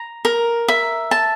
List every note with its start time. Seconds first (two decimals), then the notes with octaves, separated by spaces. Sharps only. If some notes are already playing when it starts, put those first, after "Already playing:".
Already playing: A#5
0.25 A#4
0.68 E5
1.11 A5